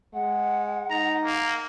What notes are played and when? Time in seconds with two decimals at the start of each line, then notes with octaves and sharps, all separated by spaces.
0.14 G#3 F#5
0.90 D#4 A#5
1.24 A#3